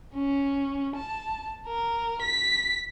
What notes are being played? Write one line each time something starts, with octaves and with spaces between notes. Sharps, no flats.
C#4
A5
A#4
B6